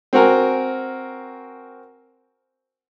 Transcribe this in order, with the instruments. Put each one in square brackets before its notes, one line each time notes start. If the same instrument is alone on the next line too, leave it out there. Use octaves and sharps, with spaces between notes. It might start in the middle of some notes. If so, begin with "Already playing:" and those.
[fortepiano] C4 F#4 A#4 G#5